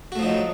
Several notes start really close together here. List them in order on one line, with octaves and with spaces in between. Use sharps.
F#4 A3 F3 D#4 F#3